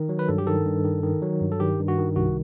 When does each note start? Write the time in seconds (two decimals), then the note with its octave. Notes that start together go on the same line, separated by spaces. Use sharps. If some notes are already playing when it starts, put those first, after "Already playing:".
Already playing: D#3
0.09 F#3
0.19 B4
0.28 G2 A4
0.38 G4
0.47 D#3 A4
0.65 G2
0.84 D#3
1.03 D#3
1.22 F#3
1.41 G2
1.52 A4
1.60 D#3 G4
1.79 G2
1.88 F#4
1.98 D#3
2.16 C2 F#4